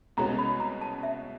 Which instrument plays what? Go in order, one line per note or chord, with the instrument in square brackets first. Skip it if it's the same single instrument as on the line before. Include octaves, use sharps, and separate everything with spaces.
[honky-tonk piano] C2 B2 G#3 C#4 F#4 [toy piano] A#5
[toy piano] B5
A#5
A5
E5